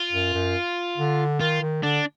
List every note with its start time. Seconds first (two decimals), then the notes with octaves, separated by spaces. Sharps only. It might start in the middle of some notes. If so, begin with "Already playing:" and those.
Already playing: F4
0.12 F#2
0.34 F#2
0.98 D3
1.40 D#3 F4
1.61 D#3
1.82 D3 D4